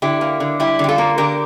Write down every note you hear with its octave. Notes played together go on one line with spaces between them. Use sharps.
D3 E4 G4
A#3
D3
G3 E4 G4
D3 G4
F4 A4
A#3
D3 G4 A#4